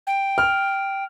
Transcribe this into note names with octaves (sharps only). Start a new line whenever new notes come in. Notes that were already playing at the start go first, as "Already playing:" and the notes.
G5
F6